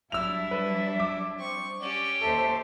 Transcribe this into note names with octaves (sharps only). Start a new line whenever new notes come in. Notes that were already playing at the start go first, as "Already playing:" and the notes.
F#3 G3 D4 E4 E5 E6 F7
B4
D6
C4 C#6
C#4 G4 D5
D#2 A4 C5 E5